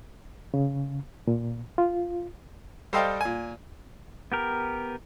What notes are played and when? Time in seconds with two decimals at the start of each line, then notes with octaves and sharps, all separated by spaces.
0.54 C#3
1.27 A#2
1.78 F4
2.93 G3 A4 C5 D#5 F5 G5
3.21 A#2 G#5
4.32 B3 G4 A#4